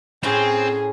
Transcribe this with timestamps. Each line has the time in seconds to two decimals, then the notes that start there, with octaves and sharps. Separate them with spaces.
0.23 A2 C4 C#4 G#4 C5